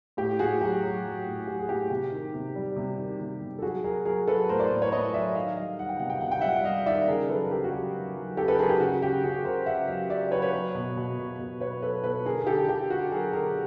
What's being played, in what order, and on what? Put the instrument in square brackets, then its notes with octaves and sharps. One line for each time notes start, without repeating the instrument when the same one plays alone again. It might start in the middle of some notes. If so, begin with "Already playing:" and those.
[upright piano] A2 G4
A2 F#4 G#4
F#3 G4
F#3
F#3
A2
F#3 G4
G#4
A2 G4
C3 G4
D#3
C3
G3
C3
D#3
C3
C3
A4
F#3 F#4 G#4
F#3 G#4 A#4
F#3 G#4 A#4
F#3 A4 B4
A2 A#4 C5
C5 D5
A2
B4 C#5
A2 C#5 D#5
F#3 D5 E5
D#3 D#5 F5
G3 D#5 F5
D#3 F#5
G5
C3 F#5
G5
C3 F#5
G5
G3 E5 F#5
G3 D#5 F5
D#3 D5 E5
C#3 G#4 A#4
F#3 A4 B4
A#4
C#3 G4 A4
F#4
F#3 G4
F#3
F#3
C#3 G4 A4
A4 B4
F#3 G#4 A#4
G4
C#3 F#4
C#3 G4
C#3 F#4 G#4
C#3 A#4 C5
C#3 E5 F#5
F#3 D#5 F5
C#3 D5 E5
F#3 B4 C#5
B4 C#5
F#3
B2
B2
B2
B2
B2 B4 C#5
F#3 A4 B4
B2 A4 B4
D3 G#4 A#4
G#4
D3 G4 A4
D3 G4
D3 F#4
F#3 G#4 A#4
D3 G#4 A#4